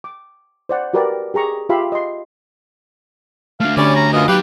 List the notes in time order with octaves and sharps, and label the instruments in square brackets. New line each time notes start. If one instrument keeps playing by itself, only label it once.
[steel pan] D6
C5 D5 F#5
F#4 G4 A#4 B4 D5
G4 G#4 A#5 C#6
F4 G4 E5 F5 B5 C6
D#5 C6
[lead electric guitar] A3 D4 [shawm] F5
[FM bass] D3 [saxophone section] G3 C#4 [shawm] D5
[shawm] A#5
[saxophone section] F#2 B2 F4 [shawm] D#5
[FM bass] F#3 [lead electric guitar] D#4 F5 [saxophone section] G4 [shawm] B4